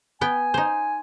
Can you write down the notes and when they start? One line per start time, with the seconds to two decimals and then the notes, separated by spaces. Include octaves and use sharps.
0.21 B3 G5 G#5
0.54 D#4 C5